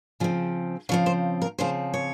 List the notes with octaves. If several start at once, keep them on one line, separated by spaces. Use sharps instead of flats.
C#3 F3 C4
C#3 F3 C4 C#5
C5
A#4
C#3 F3 C4 C5
C#5